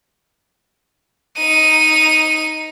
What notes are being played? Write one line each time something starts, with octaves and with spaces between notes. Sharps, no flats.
D#4 D#7